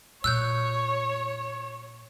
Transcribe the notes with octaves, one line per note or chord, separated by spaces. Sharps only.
A#2 C#5 E6 F#6 G6